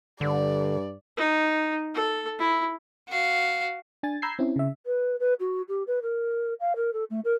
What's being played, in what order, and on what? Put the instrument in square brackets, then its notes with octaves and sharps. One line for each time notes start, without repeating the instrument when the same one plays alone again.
[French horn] G2 [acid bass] D3 [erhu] D5
[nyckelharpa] D#4
A4
E4
[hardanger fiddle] F#4 F5
[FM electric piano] D4 G#5 A6
A#5 B5 E6 G6 G#6 C7
C4 C#4 E4
C#3 E5
[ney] B4
B4
F#4
G4
B4
A#4
F5
A#4
A4
A3
A#4